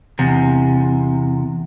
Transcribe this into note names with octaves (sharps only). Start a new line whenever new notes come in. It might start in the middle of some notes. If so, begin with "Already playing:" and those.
E2 C3